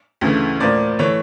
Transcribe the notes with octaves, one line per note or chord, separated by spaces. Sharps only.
D2 C#3 E3 A3
A2 F3 A#3 D5
E3 A3 C#5